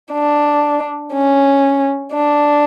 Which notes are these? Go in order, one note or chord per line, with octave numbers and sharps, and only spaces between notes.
D4
C#4
D4